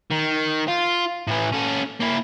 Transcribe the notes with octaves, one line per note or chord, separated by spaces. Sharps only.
D#3
F4
A2 E3
C#4 A4
A#3 E4